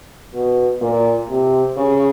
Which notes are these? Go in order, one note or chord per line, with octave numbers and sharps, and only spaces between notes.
B2
A#2
C3
C#3